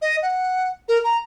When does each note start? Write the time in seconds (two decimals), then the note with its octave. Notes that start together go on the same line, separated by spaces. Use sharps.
0.02 D#5
0.23 F#5
0.88 A#4
1.04 A#5